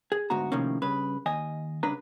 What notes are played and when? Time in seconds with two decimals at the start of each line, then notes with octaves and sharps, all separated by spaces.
0.12 G#4
0.30 D2 G#2 B3 F#4 A#5
0.52 A2 C3 D#3 F3 A#3 C#4
0.82 G2 C#3 B4
1.26 D#2 D#5 G#5
1.83 C2 C#3 D4 B4 A#5